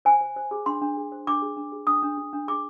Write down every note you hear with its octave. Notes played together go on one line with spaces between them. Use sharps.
C5 G#5
C5
C5
G#4
D4 C6
D4
G#4
C5
D4 D6
G#4
D4
G#4
D4 D#6
D4
D4
D4
G#4 D6